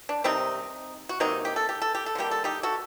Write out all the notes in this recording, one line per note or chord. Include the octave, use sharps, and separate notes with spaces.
D4
C3 D#3 G3 C4 D#4
F#4
C3 F#3 A#3 C4 D#4
G4
A4
G4
A4
G4
A4
D3 G3 A#3 G4
A4
D#4 G4
F#4 A4